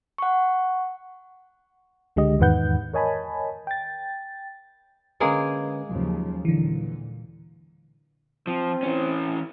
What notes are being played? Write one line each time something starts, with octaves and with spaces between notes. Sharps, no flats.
F#5 C#6
C#2 D3 G#3 G4 D#5
E2 G#2 D#3 B4 F#5 G6
A#4 C#5 D#5 G#5 A5 B5
G5 A6
D3 G#3 A#3 C#4 G#4 B4
D#2 C#3 F3 F#3
A#2 D3 E3
F3 C4
E3 C#4